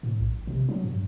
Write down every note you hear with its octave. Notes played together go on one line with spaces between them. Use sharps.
A2
A#1
C3
F#3
G2